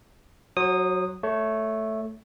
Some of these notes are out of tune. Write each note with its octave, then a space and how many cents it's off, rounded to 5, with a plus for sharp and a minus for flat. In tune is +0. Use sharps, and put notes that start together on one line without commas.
F#3 +0 C5 +45 D#6 -10
A3 +0 C#5 +20